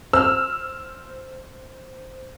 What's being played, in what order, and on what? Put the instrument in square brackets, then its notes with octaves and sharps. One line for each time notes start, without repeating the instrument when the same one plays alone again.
[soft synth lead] C5 [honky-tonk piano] E6 F6